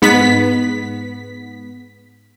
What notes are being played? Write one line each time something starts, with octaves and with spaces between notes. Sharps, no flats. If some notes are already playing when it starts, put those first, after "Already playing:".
G#2 B3 B6